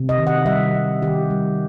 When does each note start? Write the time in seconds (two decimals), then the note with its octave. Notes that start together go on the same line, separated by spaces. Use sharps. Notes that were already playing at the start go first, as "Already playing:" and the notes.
Already playing: C3
0.09 D#5
0.18 D#3
0.27 F#5
0.46 G3 E5
0.74 G3
1.02 D#3 G4
1.30 G3